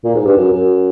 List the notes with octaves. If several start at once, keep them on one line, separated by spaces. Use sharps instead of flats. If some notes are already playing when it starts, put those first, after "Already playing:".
A#2
G#2
G2
F#2
F#2